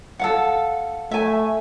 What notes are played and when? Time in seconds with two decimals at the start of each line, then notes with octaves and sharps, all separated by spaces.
0.19 A4 F5 F#5
1.11 A3 E5 G#5